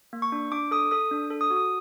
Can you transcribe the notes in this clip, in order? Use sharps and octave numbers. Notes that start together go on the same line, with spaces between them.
A#3
C#6
D4
D4 D6
A4 D#6
A4 D#6
D4
A4
D#6
F#4
D#6